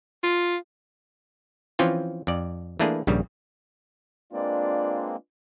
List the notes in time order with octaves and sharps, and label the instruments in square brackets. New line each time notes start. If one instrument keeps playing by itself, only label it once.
[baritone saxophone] F4
[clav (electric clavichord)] E3 F3 C4 C#4 F4
F2 D5
E3 A3 A#3 D4 G#4 B4
A#1 G2 C#3 G3
[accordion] G#3 A#3 C4 [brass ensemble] D4 F4 B4 [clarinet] D5